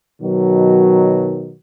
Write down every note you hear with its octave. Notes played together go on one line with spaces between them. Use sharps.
B2 D#3 F#3